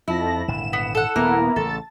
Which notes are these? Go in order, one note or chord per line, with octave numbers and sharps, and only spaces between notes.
F2 E4 A5 A#6
D#1 G#1 D3 E7
B3
A4 F#5
D#1 A#3 B3 E4 A#4
A1 C#3 A4 A6